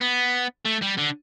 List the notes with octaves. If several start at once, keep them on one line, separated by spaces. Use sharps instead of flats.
B3
A3
G3
D3